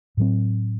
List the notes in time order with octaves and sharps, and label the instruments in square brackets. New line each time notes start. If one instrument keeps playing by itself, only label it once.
[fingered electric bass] A2 F#3 C4